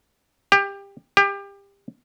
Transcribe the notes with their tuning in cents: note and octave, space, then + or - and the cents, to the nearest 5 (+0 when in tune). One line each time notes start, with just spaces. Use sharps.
G4 +20
G4 +25